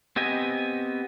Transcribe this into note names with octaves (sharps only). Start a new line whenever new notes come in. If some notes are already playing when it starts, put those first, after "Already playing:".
B3 C4 G4 D#5 G#5